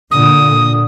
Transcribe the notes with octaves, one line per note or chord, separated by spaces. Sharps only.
A#2 D3 D#6